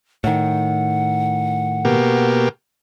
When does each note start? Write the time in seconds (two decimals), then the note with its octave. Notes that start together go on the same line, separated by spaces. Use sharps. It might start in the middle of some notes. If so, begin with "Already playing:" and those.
0.24 A2 D#3 F#5
1.85 B2 A#3 G4